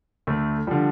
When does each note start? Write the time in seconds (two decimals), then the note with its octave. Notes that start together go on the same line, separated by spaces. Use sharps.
0.27 D2 A3
0.67 D3 F3 G3